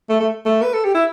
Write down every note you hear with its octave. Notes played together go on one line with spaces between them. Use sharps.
A3
A3
A3
B4
A4
G4
E4